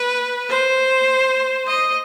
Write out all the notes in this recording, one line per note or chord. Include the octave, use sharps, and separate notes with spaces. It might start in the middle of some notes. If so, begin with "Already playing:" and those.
Already playing: B4
C5
D#5